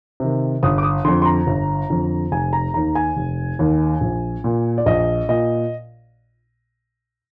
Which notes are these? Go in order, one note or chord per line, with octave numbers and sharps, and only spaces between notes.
C3 D#3
G1 D#6
D6
D#6
F2 D3 C6
C6
A#5
G1
F2 D3
F1 G#5
A#5
D#2 D#3 A#5
G#5
F1
D#2 D#3
A#1
A#2
D5
A#1 D#5
A#2 D#5